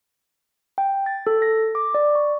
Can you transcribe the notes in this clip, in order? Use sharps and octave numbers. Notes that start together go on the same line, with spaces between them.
G5
A6
A4
A#6
D6
D5
C#6